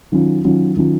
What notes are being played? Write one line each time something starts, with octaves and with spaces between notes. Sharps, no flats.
D#3 F#3 C#4 F4
D#3 F#3 C#4 F4
D#3 F#3 C#4 F4